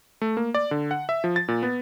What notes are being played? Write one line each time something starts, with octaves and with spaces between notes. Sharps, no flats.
A3
A#3
D5
D3
F#5
E5
F3
A6
A#2
B3